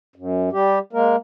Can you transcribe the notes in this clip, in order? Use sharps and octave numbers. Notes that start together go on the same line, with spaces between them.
F#2
G3 G4
G#3 A#3 A#4